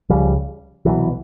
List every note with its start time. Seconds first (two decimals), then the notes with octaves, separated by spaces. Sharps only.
0.09 C#2 C#3 F3 G3
0.85 C2 B2 E3 F#3